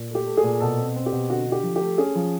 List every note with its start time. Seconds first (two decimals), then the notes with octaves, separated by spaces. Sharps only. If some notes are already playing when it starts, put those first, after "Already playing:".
Already playing: A#2
0.10 A3 G4
0.27 A3
0.37 G#4
0.43 A#2
0.60 B2 A4
0.78 C4
0.96 C4
1.06 G4
1.12 B2
1.30 D3 F#4
1.46 D3
1.52 G4
1.63 F3
1.76 A3 G4
1.98 C#4 G#4
2.15 F3